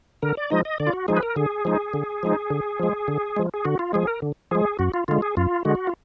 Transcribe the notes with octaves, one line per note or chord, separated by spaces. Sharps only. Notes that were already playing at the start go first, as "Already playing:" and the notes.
D3 A#4
D5
F3 G#3 D#4 D#5
D#5
D3 D5
F4
F#4
F3 G#3 D#4 G#4
B4
A#4
D3 G#4
F3 G#3 D#4
D3
F3 G#3 D#4
D3
F3 G#3
D3
F3 G#3
G#4
D3 F#4
F4
F3 G#3 G#4
A#4
D3
F3 G#3 G#4
F#2 F#4
F4
D3 G#3 F4
G#4
F#2 F4
D3 G#3 F#4
F4